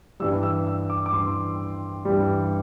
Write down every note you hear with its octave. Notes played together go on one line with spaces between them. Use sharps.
G2 E3 G3 E6
E6
E6
D6
D6
G2 E3 G3 C6
G2 E3 G3